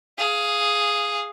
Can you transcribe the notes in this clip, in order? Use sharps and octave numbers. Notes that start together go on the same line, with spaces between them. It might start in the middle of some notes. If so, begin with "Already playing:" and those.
G#4 F5